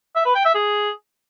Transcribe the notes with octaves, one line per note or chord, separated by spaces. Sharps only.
E5
B4
G5
E5
G#4